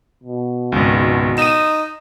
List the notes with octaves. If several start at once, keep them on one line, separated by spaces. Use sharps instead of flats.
B2
G#1 C#2
D#4 D#7 E7